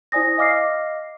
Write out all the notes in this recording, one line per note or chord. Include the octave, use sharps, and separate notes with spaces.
E4 C5 D5 G#5 D#6 A#6
D#5 F5 D6 F6 A#6 C7